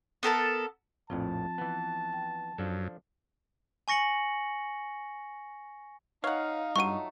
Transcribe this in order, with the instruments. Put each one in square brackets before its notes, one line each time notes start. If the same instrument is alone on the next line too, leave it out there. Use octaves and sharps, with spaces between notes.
[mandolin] B3 A4 A#4 A5
[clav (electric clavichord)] A#1 F2 A2 [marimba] F3 C4 F4 [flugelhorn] A5
[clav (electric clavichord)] E3 B3
[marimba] G5
[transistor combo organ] F#2 [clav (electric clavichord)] F3 D4 A4
[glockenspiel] G#5 C#6 A#6 C#7 F#7
[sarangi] D#4 [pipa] C#5 F#5 [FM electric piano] F5
[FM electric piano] G2 [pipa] F#3 A3 F4 [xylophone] C#6 D#7